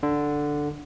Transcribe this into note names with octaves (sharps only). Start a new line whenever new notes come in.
D3